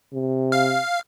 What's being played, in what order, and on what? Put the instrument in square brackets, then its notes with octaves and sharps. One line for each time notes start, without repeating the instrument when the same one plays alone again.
[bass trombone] C3
[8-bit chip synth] F5